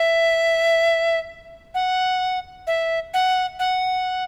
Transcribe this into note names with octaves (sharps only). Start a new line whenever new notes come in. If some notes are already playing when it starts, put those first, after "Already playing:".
Already playing: E5
F#5
E5
F#5
F#5